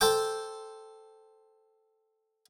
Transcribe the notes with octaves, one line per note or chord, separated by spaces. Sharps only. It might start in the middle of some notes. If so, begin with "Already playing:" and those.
A4 C5 G5 D6